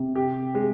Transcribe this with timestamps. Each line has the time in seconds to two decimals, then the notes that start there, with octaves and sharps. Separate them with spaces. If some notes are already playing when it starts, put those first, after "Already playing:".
Already playing: C3
0.15 G4
0.55 G#3